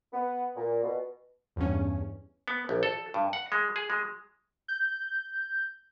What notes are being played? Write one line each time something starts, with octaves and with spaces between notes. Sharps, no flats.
B3
A#2
B2
E2 G2 C#4
B3
A#1
A4
G2
F#5
G#3
G#4
G#3
G6